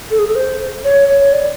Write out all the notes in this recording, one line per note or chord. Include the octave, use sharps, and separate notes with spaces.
A4
G#4
A4
C5
C#5
C#5
D5